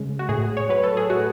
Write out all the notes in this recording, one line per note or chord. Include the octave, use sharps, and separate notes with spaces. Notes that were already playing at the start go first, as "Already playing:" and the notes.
Already playing: C#3 G#3
F#4
A2 G#4
C#5
F#3 B4
A4
G#4
A2 F#4